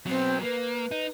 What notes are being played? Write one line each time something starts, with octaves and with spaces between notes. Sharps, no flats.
F#3 B3 C4
A#3 B4
D#4